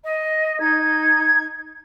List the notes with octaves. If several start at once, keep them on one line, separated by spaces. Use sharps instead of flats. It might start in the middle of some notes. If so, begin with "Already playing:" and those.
D#5
D#4 G#6